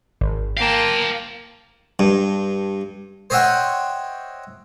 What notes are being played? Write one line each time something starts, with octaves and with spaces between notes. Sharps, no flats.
G#1
A#3 F5 G5 A5
G2
C5 C#5 D#5 E5 F#5 G5